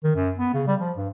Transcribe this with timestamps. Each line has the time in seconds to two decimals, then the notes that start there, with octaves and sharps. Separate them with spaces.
0.04 D#3
0.15 F#2
0.38 B3
0.54 C#3
0.67 G3
0.80 F3
0.96 G2